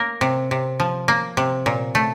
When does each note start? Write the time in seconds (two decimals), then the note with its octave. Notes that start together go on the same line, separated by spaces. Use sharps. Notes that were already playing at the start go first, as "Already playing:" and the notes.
Already playing: A#3 A#4
0.21 C3
0.51 C3
0.80 F3
1.08 A#3
1.37 C3
1.66 A#2
1.95 A3